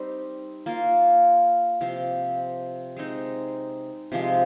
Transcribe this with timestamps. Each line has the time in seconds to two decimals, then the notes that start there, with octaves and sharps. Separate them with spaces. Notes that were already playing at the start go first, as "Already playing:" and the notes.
Already playing: G3 C4 D#4
0.66 A#3 F4 A#4
1.81 C3 F3 C4
2.97 G#3 C4 D#4
4.12 C3 F3 G#3